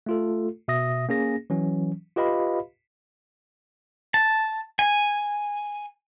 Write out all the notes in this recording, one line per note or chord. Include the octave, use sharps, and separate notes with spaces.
A3 F4 A4
B2 E5 D#6 A#6
A#3 C#4 G#4 A#6
E3 F#3 C#4
F4 G4 B4 D#5 F5 B5
A5
G#5